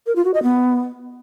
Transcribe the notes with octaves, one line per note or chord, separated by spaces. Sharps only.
A#4
F4
F#4
D#5
B3